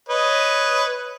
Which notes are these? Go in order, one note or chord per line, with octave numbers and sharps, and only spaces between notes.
B4 C#5 D#5